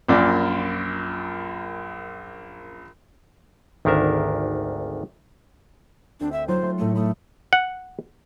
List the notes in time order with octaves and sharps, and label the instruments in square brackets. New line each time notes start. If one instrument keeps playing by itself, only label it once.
[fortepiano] A#1 F#2 A#2 D5
[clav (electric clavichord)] G#1 D2 D#3 D4 A#4 E5
[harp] D2 C4 [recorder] D4
[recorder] E5
[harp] F#3 D#4 F4 [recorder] C5
[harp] A3 C6
[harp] A2 D#5 C#7 [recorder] A3
[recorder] A3 [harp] B5 D#6
[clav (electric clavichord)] F#5